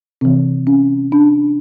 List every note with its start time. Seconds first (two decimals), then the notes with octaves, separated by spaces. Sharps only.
0.21 C3 E3 C4
0.67 C#4
1.12 D4